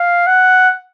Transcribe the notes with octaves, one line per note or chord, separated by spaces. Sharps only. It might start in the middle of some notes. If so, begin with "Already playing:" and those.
Already playing: F5
F#5